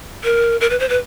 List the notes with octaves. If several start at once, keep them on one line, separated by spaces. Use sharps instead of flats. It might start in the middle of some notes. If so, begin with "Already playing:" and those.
A#4
A#4
B4
C5
B4